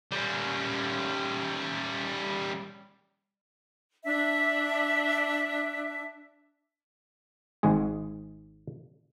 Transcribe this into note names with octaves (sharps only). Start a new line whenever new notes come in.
G3 C#4
D4 E5
G#1 G#2 G#3 G#4